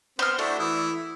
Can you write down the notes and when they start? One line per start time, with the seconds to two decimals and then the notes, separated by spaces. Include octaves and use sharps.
0.19 B3 C4 C5 F6
0.39 A3 D4 E4 F#4
0.59 E3 E4 D#6